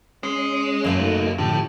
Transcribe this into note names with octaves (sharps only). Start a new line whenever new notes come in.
G#3 C#4 C6
F#2 F#3 A#3 E5 G#5
A3 D#4
A2 D3 F3 G4